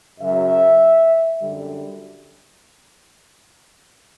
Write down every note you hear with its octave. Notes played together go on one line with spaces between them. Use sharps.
F#2 C#3 F#3 E5
F#2 D3 G3